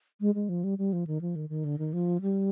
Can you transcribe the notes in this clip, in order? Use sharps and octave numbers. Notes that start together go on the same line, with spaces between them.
G#3
G#3
F3
G3
G3
F3
D#3
F3
D#3
D#3
D3
D#3
F3
G3